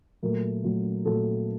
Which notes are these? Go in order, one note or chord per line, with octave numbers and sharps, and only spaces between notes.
A#2 F#3 A3 A#4
A#2 F#3 A3
A#2 F#3 A3 A4